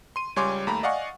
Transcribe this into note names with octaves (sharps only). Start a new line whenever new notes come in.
C6 D#7
C#2 G3 C#5 G#5 C6 D6
D#2 A3 A#5 B5
D5 D#5 F5 F#5 G#5 C#6